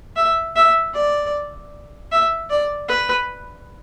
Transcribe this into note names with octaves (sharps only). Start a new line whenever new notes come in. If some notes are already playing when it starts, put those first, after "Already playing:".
E5
E5
D5
E5
D5
B4